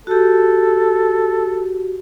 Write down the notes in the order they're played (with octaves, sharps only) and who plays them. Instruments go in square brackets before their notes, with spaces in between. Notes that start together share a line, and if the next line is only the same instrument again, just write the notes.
[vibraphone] F#4 G4 [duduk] A4